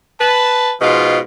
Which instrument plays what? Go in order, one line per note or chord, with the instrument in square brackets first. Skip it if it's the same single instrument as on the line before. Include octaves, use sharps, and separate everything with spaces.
[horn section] B4 A5
G#2 B2 F3 F4